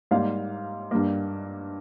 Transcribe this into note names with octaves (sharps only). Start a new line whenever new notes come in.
G#2 G3 A#3 F5
G2 G3 A#3